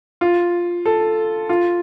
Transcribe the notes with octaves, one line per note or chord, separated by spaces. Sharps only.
F4
A4
F4